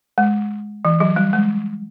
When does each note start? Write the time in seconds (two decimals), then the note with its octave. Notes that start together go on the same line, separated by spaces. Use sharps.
0.18 G#3
0.85 E3
1.00 F#3
1.16 G3
1.33 G#3